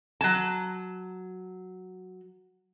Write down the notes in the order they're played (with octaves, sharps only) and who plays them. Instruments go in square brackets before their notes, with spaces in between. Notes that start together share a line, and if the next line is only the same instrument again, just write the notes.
[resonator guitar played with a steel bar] F#3 A5